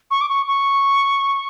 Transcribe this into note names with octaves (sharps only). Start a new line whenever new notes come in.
C#6
D6
C#6
C#6